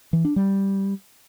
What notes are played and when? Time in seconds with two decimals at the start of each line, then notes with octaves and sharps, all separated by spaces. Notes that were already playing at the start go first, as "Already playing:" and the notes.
0.13 E3
0.25 D4
0.36 G3